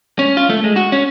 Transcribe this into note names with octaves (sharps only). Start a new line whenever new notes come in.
C#4
F4
A3
G#3
F#4
C#4